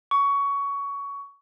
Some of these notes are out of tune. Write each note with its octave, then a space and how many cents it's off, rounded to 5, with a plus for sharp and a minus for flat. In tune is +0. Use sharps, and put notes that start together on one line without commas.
C#6 +20